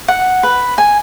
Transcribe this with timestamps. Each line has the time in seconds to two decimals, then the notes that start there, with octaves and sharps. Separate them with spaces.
0.08 F#5
0.43 B4
0.78 G#5